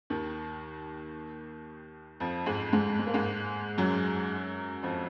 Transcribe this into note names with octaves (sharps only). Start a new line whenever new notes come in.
D#2 D#3
F2 F3
G#2 G#3
G#2 G#3
G#3
A#3
G#2 G#3
F#2 F#3
F2 F3